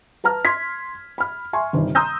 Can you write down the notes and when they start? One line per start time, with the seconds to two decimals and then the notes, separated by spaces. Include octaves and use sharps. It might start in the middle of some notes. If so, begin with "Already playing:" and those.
0.24 B4 A5 A#5 F6
0.45 C6 G#6 B6
1.18 B5 F6
1.53 E5 G#5 C6 C#6
1.73 G1 G2 C3 D#3
1.95 A#5 C6 D#6 E6 G6 A#6